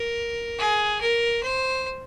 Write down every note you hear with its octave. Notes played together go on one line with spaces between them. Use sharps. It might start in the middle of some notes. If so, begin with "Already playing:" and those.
Already playing: A#4
G#4
A#4
C5